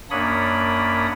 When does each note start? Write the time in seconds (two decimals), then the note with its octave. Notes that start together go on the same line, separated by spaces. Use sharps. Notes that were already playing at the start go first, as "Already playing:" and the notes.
0.10 F#2 A#3 D4 C#5 B5 D#6